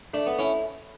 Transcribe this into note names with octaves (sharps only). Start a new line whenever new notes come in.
A3 D4
B3
C#4 E4